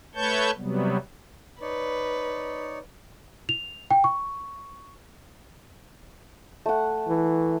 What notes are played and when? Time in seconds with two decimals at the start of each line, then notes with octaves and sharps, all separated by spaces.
0.15 A3 B4 C#5 A5 C#6 G6
0.57 C3 F#3 G3 B3
1.61 D#4 B4 C#5 D5
3.49 F7
3.91 G5
4.04 C#6
6.66 A3 F#5
7.08 E3